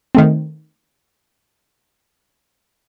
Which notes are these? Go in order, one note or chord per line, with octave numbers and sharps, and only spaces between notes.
D#3 A3 C4